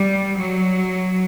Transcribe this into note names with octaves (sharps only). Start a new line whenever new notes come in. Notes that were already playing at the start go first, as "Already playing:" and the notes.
Already playing: G3
F#3